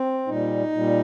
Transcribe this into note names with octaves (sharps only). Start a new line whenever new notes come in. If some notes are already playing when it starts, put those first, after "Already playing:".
Already playing: C4
A#2 G3 D#4
A#2 G3